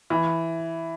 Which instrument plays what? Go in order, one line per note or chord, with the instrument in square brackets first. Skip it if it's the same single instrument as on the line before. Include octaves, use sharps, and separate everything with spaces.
[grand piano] E3